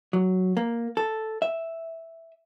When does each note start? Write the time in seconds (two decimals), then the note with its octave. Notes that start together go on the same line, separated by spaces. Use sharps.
0.13 F#3
0.57 A#3
0.97 A4
1.42 E5